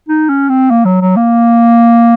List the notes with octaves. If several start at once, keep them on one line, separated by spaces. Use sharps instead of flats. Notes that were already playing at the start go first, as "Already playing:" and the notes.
D#4
C#4
C4
A#3
F#3
F#3
A#3